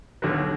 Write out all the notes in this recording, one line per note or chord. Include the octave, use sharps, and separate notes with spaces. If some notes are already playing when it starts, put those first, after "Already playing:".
D#2 D3 F#3